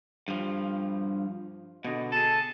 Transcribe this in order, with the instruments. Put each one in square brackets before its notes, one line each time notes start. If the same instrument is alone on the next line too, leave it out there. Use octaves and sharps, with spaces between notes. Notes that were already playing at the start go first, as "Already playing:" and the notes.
[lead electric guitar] G2 F3
[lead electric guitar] B2 D3 [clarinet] D#5
[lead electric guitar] G#4 A4 [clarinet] A5